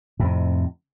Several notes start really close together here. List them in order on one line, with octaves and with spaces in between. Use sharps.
A2 F2 C3